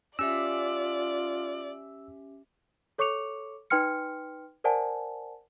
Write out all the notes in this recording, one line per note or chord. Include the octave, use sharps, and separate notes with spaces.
C#4 F4 G4 D5 E5 E6
A4 C#5 C#6 D6 C#7 F7
D#4 B4 G5 C6 F6 C#7
A#4 C5 D5 F#5 G#5 A5